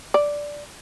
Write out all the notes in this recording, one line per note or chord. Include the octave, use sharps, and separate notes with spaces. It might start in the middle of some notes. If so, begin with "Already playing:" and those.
D5